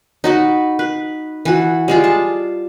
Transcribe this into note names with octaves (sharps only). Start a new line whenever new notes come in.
D#4 F#4 B4
B4
E3 F#4
G3 G#3 F4
A5